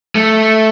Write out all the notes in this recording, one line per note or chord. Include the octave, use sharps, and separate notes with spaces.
A3